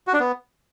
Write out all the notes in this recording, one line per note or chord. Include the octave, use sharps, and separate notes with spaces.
F#4
D4
B3